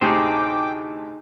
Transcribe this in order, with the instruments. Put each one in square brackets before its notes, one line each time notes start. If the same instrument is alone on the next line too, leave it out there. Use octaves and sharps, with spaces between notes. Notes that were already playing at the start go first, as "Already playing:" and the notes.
[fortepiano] D2 A2 C3 [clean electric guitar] D#4 G#4 C5 [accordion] G5 D6